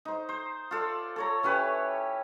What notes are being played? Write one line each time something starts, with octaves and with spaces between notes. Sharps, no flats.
D#4 C5
C5
F4 A4 D5
A4 C#5 A#5
E3 C#4 G4 B4